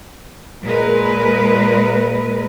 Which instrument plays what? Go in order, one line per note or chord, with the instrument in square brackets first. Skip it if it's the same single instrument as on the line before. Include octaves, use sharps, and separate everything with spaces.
[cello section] A#2 G#3 A#4 B4